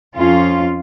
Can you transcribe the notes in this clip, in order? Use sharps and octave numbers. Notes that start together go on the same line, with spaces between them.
F2 C#4 F4